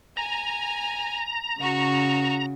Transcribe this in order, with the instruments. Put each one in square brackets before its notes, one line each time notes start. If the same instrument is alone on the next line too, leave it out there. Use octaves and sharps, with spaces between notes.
[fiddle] G#5 [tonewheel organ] A#5
[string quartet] C#3 [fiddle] F#4 C#6